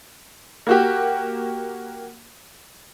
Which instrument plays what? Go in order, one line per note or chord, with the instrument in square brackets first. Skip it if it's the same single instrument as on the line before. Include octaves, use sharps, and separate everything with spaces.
[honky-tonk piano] A#3 F#4 G4